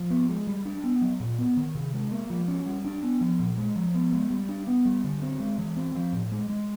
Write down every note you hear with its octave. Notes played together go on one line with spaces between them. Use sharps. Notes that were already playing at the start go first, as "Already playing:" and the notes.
Already playing: F3
B3
G#3
G3
D4
B3
F#3
A#2
B3
D#3
C3
G#3
A#3
F3
C#4
G3
D4
B3
F3
A#2
G#3
F3
B3
G#3
G3
D4
B3
G3
D3
C4
G#3
E3
C4
F3
A2
G#3
G#3